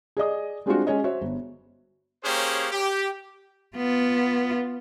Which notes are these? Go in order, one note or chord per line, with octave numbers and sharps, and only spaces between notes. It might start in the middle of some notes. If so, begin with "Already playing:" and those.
G#4 D5 D#5 D#6
G3 G#3 C4 D4 F4 F#4
G#3 C#4 G#4 C#5 D#5
F#4 C5 C#5 E5
G1
A#3 C#4 G4 G#4 C5 C#5
G4
B3 F4